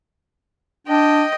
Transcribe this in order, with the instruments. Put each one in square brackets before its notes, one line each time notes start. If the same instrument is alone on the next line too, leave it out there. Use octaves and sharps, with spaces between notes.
[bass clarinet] D4 [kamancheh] D#5 G5